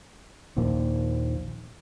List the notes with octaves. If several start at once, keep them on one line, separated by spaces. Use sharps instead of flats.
A#1 D#2 A#2 F3